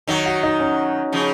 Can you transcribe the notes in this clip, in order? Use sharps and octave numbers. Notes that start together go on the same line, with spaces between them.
D#3 F#3 D#4
F#4
D#4
C#4
C#3 F3